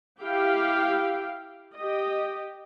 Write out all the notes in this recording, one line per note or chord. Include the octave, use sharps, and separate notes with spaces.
E4 G4 F5 G5
G4 D#5